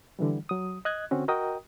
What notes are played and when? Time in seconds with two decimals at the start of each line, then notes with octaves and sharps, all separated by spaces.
0.19 D3 E3 G3
0.49 F#3 D#6
0.85 D#5 F#6 G#6
1.11 D3 C4 C#4 F#4
1.28 F#4 A#4 D#5 G5 A#5 D#6